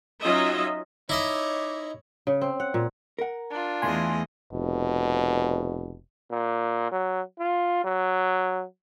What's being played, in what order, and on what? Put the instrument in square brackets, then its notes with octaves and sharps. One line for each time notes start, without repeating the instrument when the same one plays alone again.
[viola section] F#3 C#4 D#4 F4 D#5 E5
[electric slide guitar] D#4 [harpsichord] E4 D#5 E5 [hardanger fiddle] C#5 [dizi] D6
[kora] C#3
C4
F#5
A#2
[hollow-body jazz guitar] A#4 F#5
[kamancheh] D4 F4
[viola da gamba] E2 A3 D#5 [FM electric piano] G#5 C6
[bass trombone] F1 [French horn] B2
[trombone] A#2
F#3
F4
F#3